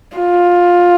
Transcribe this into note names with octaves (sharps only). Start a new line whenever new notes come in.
F4